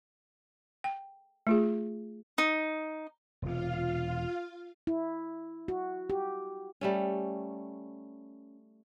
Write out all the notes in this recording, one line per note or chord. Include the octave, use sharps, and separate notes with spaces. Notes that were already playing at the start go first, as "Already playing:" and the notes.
G5
A3 F4 G#4
D#4
E1 C3 F4 F5
E4
F#4
G4
G3 A3 C#4